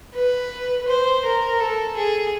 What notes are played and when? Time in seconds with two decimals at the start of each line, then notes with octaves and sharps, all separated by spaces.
0.15 B4
0.88 C5
1.25 A#4
1.60 A4
1.97 G#4